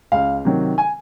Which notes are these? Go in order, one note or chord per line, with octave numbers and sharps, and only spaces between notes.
C#2 F5
C3 D#3 F#3
G#5